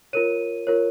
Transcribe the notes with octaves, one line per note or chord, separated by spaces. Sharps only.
F4 A#4 C#5 D#7
F4 A#4 C#5